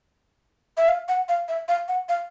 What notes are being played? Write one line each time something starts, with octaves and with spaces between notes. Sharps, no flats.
E5
F5
F#5
F5
E5
F5
F#5
F5